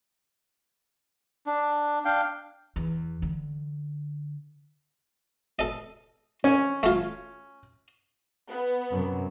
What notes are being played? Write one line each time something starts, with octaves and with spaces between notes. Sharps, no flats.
D4
D4 F5 G5
E2
D3
A4 D#5
C#4
A3 F4
B3
F#2 C3